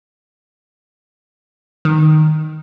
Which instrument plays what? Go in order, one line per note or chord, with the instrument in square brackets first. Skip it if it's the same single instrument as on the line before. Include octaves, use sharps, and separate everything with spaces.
[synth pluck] D#3